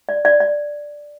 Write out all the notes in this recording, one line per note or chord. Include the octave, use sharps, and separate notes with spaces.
D5
D5
D5